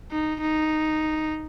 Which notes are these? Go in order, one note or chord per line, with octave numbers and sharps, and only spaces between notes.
D#4
D#4